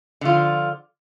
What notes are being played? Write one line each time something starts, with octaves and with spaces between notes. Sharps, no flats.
D3 F3 F4